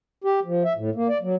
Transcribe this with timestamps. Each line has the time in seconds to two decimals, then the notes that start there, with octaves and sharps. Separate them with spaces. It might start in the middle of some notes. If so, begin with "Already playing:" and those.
0.24 G4
0.45 F3
0.65 E5
0.77 A2
0.95 A#3
1.09 D5
1.22 F#3